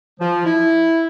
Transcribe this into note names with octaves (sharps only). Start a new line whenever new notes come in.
F3
E4